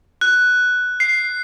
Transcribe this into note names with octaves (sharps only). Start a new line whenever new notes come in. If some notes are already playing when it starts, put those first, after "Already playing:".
F#6
C7